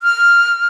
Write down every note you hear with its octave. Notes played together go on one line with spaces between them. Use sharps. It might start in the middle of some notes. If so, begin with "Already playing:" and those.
F6